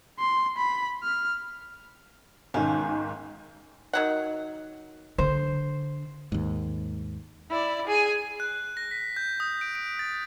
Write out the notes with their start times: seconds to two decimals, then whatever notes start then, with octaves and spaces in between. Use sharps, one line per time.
0.19 C6
0.57 B5
1.03 F6
2.54 B1 G#2 D#3 C#4
3.93 D#3 F#3 F#5
5.18 D3 C5
6.32 D#2 G#2
7.50 E4 D5
7.87 G#4 G#5
8.40 F#6
8.77 A#6
8.91 B6
9.16 G6
9.40 D#6
9.61 D7
9.75 D7
9.99 A6